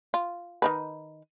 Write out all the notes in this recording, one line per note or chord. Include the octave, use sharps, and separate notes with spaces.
F4
D#3 D#4 B4